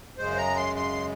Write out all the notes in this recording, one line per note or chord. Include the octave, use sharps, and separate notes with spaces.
F#2 C#3 G#3 C5
A#5
C6
C6